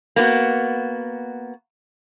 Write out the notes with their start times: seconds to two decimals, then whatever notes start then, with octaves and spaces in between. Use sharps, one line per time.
0.16 A#3 B3 F#4